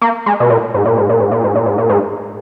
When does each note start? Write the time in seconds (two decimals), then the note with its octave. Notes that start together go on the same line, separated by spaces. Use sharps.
0.01 A#3
0.26 G#3
0.40 B2
0.50 A#2
0.74 G#2
0.85 A#2
0.98 G#2
1.09 A#2
1.20 G#2
1.32 A#2
1.44 G#2
1.55 A#2
1.66 G#2
1.78 A#2
1.89 G#2